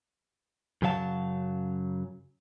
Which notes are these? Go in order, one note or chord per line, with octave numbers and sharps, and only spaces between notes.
F#2 C#3 F#3 F5 A5